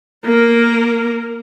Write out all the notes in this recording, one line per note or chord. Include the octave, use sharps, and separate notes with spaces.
A#3 A#4